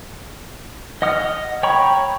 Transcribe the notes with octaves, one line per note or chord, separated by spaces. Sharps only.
D#5 F#5 D#6 F6
C#5 G5 A#5 B5 C#6